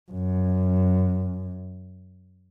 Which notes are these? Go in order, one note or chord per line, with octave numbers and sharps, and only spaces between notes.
F#2